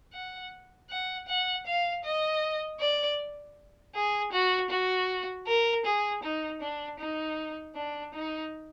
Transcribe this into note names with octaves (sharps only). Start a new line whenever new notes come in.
F#5
F#5
F#5
F5
D#5
D5
G#4
F#4
F#4
A#4
G#4
D#4
D4
D#4
D4
D#4